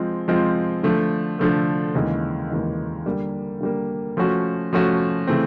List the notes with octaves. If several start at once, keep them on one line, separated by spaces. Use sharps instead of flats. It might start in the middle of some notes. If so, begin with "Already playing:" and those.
Already playing: F3 G#3 C4 F4
F3 G#3 C4 F4
D3 F3 A3
D3 F3 A3
D#2 C#3 E3 G#3
D#2 C#3 E3 G#3
D3 G3 A#3
D3 G3 A#3
F3 A3 C#4 F#4
F3 A3 C#4 F#4
C#3 E3 A3 C4